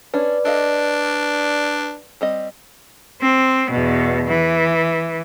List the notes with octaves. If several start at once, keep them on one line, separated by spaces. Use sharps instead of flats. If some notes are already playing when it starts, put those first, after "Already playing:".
C#4 D4 B4 D5
D4 A4 D#5 F5
G3 C4 D#5
C4
E2 B2
E3